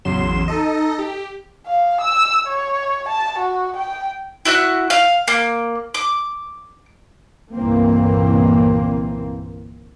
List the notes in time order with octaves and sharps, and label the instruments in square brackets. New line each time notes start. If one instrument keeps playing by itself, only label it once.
[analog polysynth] A1 E2 C#3 F#3 C6 E7
D#4 A4 D#5
G4
[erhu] F5
E6
C#5
A5
F#4
G5
[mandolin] E4 F#4 E5 F#6
F5
A#3
D6
[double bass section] G1 C2 A#2 E3 A#3 C4